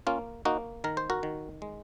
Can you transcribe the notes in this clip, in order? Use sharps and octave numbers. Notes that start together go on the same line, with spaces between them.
A#3 C#4 F4
A#3 D#4 F#4
D#3 A#4
C5
F#4 A#4
D#3
G#3